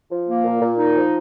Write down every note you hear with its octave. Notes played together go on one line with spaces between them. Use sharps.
F3
A#3
A#2
A#2
D#4
F3